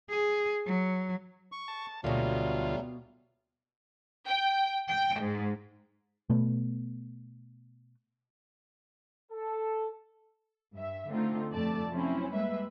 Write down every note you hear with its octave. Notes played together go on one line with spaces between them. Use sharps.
G#4
F#3
C#6
A5
D2 B2 F#3 G3 A3 A#3 F4
G5
G5
G#2
B2 A3 B3
A4
G2 E5
D3 A3 C4 D#4 F4
F2 C3 A3 D5 A5
F3 F#3 C4 C#4 E4
G3 G#3 A#3 B4 E5